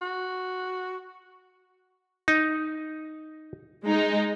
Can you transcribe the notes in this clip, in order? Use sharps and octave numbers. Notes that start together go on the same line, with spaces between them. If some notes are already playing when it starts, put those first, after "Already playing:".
F#4
D#4
G#3 D#4